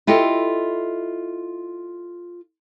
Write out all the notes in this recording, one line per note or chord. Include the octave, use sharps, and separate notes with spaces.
E4 F4 G4 A4 D#5